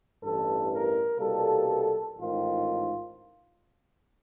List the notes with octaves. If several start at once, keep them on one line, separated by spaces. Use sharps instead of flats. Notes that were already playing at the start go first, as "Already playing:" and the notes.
A1 G2 E3 A4
A#4
C2 B2 G3 A#3 A4
A1 G#2 D#3 F4